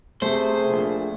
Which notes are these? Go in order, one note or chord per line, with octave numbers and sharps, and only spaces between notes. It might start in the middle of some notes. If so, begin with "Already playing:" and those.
C3 A3 G#4 C5
A#1